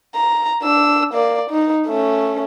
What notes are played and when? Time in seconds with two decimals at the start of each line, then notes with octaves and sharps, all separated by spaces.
0.15 A#5
0.63 D4 E6
1.14 A#3 D5
1.50 D#4
1.87 A3 C#4